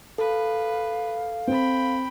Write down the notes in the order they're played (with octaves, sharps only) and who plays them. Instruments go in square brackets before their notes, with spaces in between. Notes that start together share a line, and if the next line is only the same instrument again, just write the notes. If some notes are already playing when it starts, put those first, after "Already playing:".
[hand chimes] A4 [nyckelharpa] B4 [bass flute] F5
[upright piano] C4 [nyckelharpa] G5 B5